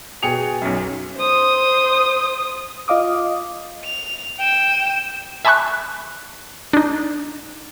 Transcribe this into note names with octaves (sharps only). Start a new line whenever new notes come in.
B2 G#4 G5 G#5 C#7 F7
B1 F#2
C5 D#6
F4 D#5 F5 D6 D#6
F7
G5 E7
E5 G#5 A5 B5 C#6 F#6
D4 D#4